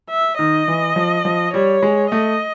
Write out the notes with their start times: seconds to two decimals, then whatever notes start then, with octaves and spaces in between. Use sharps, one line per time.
0.10 E5
0.38 D#3 D#5
0.68 E3
0.96 F3
1.25 F3
1.54 G3 C#5
1.82 G#3
2.11 A3 D#5